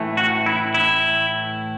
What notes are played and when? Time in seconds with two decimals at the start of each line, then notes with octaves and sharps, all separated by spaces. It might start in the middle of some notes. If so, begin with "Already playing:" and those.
Already playing: A2 E3 A3
0.17 F#4
0.46 E4
0.74 E4